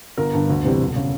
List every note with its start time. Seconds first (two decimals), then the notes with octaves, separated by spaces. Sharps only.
0.18 G1 A#4
0.34 G2 D3
0.50 D2
0.65 C3 E3 G3 C4
0.80 E1
0.96 C#3